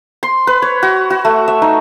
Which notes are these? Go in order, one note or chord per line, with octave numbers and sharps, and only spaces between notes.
C6
B4
C#5
F#4
F#4
A3
E5
D#4